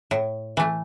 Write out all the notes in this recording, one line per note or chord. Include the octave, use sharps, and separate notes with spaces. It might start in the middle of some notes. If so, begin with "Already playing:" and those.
A2
E3 A3